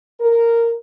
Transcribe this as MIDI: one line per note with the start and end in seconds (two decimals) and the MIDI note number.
0.19 0.73 70